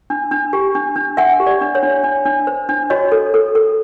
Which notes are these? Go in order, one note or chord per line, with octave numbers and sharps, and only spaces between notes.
D4
D4
G4
D4
D4
D4 E5 F#5
G4
D5
D4
C#5
D4
D4
D4
C5
D4
F#4 C#5 D#5
A4
A4
A4